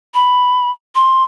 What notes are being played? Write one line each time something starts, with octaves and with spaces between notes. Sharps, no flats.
B5
C6